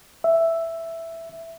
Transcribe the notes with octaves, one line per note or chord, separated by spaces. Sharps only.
E5